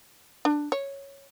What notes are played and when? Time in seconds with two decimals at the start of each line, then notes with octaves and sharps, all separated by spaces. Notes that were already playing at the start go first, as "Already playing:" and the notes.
0.45 D4
0.72 C#5